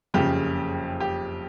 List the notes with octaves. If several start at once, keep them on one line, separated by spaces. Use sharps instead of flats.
F#1 F2 C#3 G4
G4